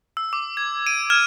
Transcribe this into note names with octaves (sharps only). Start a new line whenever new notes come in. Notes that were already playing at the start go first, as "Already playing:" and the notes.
E6
D6
G#6
D7 D#7
F6 G#6 E7